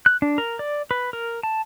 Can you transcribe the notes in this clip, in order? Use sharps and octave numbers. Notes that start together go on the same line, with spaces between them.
F#6
D4
A#4
D5
B4
A#4
A5